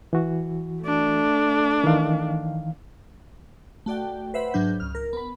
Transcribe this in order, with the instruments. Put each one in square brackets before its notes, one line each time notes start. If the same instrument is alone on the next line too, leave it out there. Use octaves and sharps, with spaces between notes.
[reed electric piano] E3 F#4
[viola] A3 D4
[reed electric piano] D#3 E3 F5
[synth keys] A3 F#4 D5 G5
B4 C5 E5 F#5 B5
G#2 F#3 D4 G6
C#2 F6
A#4
B3 B5